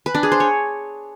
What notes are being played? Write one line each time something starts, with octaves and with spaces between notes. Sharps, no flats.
B4
D4
G#4
C5
C#5